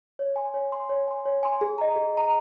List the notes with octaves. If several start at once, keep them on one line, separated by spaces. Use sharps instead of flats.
C#5
G#5 C6
C#5
G#5 C6
C#5
G#5 C6
C#5
G#5 C6
G#4
D#5 A#5
G#4
D#5 A#5